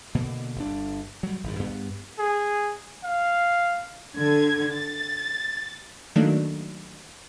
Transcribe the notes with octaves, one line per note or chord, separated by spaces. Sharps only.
B2 D3 A#3
G1 D4
F#3 G3
G#1 G2
G2 B3
G#4
F5
D3 G#6
A6
D#3 F#3 A3 A#3 D4 D#4